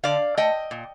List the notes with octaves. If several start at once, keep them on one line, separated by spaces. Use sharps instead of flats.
D3 D5 F5
A3 D#5 G5
A#2